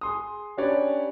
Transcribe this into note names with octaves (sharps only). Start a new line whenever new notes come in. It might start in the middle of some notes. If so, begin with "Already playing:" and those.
G#4 C6 D#6
C#4 D4 G4 B4 C#5 D5